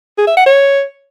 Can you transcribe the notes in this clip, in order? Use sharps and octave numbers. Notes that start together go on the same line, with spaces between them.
G#4
E5
F#5
C#5